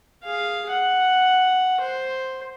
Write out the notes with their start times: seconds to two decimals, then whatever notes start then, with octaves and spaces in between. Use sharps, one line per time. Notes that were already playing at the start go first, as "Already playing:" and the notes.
0.24 G#4 F5
0.70 F#5
1.81 C5